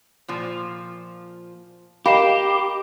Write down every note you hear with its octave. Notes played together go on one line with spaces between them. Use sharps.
A#2 F3
G4 A#4 D#5 F5 B5 C7 E7